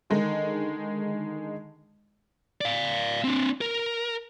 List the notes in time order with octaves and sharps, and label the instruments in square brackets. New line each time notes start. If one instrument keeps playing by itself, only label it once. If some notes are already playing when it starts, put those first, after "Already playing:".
[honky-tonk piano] D3 D#3 G#3 D#4
[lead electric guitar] D5 F5
C4 D4
A#4